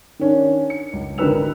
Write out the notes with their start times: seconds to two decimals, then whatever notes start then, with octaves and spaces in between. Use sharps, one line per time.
0.19 D#3 C#4 D4
0.70 C#7
0.93 C#2
1.18 G#1 D3 A#4 B4 E6 F7